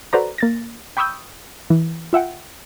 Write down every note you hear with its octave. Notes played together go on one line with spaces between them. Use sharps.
F#4 A4 B4 C5 D5 A#5
A#3 A6 A#6
G5 B5 C#6 D#6 E6 G6
E3
F4 E5 F#5 G5